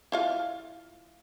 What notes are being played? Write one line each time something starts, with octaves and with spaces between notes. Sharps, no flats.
E4 F4 F5